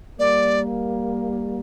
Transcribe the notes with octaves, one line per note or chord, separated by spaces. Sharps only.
G3 A#3 D5